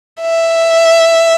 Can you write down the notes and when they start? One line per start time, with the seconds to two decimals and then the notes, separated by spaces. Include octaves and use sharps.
0.22 E5